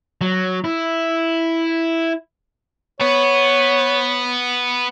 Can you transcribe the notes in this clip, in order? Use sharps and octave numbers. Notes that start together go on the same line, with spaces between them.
F#3
E4
B3 C#5